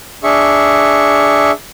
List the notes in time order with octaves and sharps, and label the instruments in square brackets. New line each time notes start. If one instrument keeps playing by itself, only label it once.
[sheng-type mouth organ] D4 G#4 E5 C#6